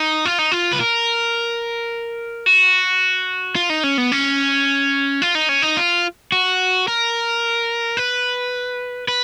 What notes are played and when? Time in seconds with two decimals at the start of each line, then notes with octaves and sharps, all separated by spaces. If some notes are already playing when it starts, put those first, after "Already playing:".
Already playing: D#4
0.25 F4
0.39 D#4
0.52 F4
0.73 B4
0.80 A#4
2.46 F#4
3.56 F4
3.70 D#4
3.84 C#4
3.98 B3
4.12 C#4
5.22 F4
5.35 D#4
5.49 C#4
5.62 D#4
5.77 F4
6.32 F#4
6.88 A#4
7.97 B4
9.08 B4